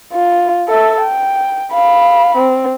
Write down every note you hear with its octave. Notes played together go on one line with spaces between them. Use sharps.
F4
A4 E5
G5
F5 B5
C4